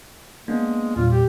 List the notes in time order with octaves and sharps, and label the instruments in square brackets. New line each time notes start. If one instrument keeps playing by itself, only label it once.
[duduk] G#3 [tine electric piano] A#3 B3 D4
[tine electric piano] E2 A#2 G3 [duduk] F4
[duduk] G4